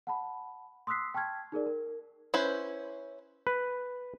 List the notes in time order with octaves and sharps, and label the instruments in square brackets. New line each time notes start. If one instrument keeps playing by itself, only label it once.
[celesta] F#5 A5 B5
C6 D#6 E6 F#6 B6 C7
G5 A5 C#6 F6 G#6
D#4 G#4 A#4 D5
A#4
[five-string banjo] C#4 E4 B4 C5
[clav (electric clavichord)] B4